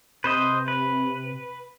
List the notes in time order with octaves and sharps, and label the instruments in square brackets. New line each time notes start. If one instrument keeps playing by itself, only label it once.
[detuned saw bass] C3 [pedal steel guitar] B4 C5 D#5
[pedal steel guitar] B4